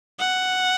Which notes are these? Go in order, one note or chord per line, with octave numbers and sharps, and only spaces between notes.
F#5